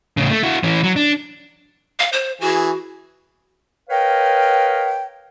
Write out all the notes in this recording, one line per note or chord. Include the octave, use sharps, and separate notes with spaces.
A2 C#3
A3
E4 F#4
E3 C#4
F#3
D4
F5
C5
E3 F#4 G#4
A#4 B4 C#5 D#5 F5 G5